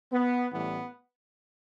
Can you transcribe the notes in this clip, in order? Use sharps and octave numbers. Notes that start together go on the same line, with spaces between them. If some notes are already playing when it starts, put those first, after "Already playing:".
B3
A1 A2 E3 G3 B3